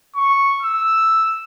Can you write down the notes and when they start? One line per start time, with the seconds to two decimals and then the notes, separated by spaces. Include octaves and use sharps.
0.15 C#6
0.62 E6